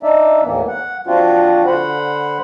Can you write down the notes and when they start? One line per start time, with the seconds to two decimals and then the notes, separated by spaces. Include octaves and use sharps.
0.03 D4 D#4 D5 E5
0.44 D#2 A2 E3 A#3 B3
0.68 F#5
1.07 F3 C4 D4 F4 F#4
1.67 D3 C5 F#5 B5